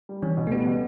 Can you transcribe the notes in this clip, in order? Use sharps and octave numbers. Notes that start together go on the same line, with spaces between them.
G3
E3 C#4
B2
A3
G3 B3
B2